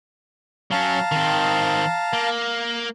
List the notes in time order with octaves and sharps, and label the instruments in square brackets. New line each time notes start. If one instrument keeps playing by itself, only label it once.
[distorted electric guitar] F#3 C#4 [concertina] F5 A5 A#5
[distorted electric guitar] D#3 C4
A#3